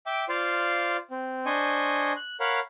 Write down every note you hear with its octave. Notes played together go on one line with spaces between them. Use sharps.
E5 G5 D6
F4 C5 D5 F5
C4
D4 C5 D#5 G#5 C#6
F#6
A#4 C#5 F5 F#5 B5